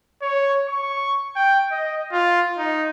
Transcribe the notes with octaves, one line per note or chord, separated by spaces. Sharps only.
C#5
C#6
G5
D#5
F4
D#4